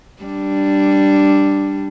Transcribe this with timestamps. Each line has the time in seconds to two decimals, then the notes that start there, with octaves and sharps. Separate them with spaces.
0.23 G3 D4